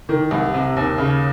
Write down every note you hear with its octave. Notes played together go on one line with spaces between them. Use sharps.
D#3
C2
C3
D#2
C#3